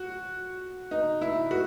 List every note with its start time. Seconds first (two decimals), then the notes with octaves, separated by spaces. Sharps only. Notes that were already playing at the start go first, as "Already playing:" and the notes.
Already playing: F#4
0.91 D#4
1.21 E4
1.51 F#4